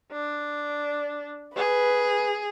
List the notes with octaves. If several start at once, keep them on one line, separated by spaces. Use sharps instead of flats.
D4
G#4 B4